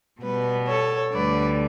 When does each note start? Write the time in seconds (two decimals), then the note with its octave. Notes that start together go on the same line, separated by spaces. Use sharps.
0.22 B2 G3 B3 B4
0.68 A4 C#5
1.13 D2 D3 G3 B4 D5